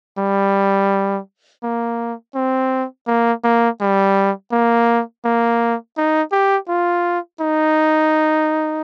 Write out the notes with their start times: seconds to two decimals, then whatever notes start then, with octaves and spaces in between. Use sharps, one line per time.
0.19 G3
1.63 A#3
2.35 C4
3.07 A#3
3.44 A#3
3.81 G3
4.52 A#3
5.25 A#3
5.97 D#4
6.32 G4
6.69 F4
7.41 D#4